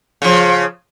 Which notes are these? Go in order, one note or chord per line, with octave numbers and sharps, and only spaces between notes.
C#3 F3